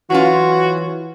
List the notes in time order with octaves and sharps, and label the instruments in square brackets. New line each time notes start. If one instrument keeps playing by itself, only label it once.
[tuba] E3 [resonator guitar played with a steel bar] F#3 C#4 F4 [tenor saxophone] F#4